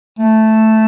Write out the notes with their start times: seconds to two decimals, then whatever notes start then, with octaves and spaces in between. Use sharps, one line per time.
0.19 A3